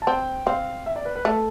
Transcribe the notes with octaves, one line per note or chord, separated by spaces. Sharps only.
A5
C4 G5
C4 F5
E5
D5
B4
B4
A3 A4